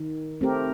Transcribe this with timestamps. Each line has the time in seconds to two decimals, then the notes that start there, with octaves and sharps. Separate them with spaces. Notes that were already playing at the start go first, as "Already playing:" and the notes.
Already playing: D#3
0.41 A3 C4 G4 A#4